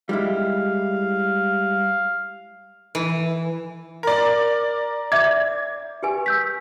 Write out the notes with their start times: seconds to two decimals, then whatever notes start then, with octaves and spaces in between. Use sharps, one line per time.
0.09 G3 G#3 E4 F5
2.95 E3
4.03 A#4 D5
5.12 D5 E5 D6 G#6
6.03 G4 B4 G#5
6.26 E6 G6 B6